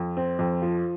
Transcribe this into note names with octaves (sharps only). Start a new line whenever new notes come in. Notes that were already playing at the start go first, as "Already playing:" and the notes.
Already playing: F2
C4
F2
F3